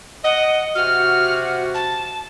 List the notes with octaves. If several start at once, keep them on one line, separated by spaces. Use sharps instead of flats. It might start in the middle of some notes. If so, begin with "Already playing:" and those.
D#5 F#5
C3 F#4 F6
A5